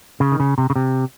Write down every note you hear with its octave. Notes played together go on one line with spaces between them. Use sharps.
C#3
D#3
C#3
C3
C#3
C3